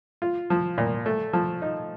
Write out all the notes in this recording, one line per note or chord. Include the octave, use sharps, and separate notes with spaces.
F4
F3
A#2
A3
F3
D#4